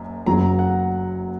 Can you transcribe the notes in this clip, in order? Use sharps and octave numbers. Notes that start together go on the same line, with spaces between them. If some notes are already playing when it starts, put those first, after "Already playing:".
Already playing: F#1 F#2
F#1 F#2 C#3 F#3 A#5
F#5